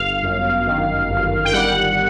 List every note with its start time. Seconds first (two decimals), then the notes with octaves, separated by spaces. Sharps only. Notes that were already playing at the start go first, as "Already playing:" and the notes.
Already playing: G1 F5
0.23 F#2
0.67 D#3
1.10 G1
1.45 G5
1.53 G3 F#5